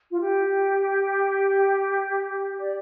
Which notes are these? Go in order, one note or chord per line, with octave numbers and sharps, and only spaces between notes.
F4
G4
D5